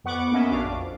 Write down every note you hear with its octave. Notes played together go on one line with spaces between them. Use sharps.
F2 B3 F#5 C#6 D6
A#3 B3 C#4 D#5 E5
A#1 D4 F#4 F5 D6
F2